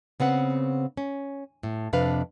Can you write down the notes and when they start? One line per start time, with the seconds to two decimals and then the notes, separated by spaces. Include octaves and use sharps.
0.20 C#3 B3 C4 F#5
0.97 C#4
1.63 A2
1.93 F2 C3 D4 B4 F5